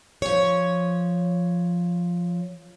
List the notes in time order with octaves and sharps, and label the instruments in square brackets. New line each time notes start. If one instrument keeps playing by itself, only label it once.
[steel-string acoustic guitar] F3 C#5